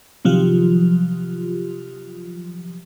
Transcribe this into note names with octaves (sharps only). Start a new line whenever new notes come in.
C3 D#3 F3 F#3 F4 G4